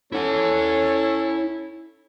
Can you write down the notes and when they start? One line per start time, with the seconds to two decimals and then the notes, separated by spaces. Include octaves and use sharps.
0.12 C#4 E4 A4 F#5